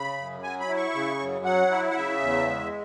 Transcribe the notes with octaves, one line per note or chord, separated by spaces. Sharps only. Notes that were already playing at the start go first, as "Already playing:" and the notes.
Already playing: C#3 B5
F#2
F#3 G#5
B5
E4
C#6
C#3
F#2
F#3 F#5
E4
F#5
C#3 E5
E2
G#3